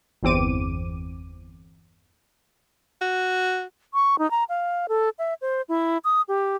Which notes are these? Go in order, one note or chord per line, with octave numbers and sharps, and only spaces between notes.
G1 E2 C4 D6 D#7
F#4
C#6
D#4
A#5
F5
A4
E5
C5
E4
D#6
G4